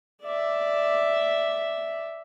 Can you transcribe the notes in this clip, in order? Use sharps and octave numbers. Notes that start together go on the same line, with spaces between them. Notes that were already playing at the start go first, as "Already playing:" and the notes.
D5 E5